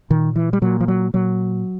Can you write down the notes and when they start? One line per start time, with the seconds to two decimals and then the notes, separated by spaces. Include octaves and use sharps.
0.10 A#2 D#3
0.36 E3
0.53 G3
0.62 A#2 F#3
0.80 F3
0.88 F#3
1.14 A#2 F#3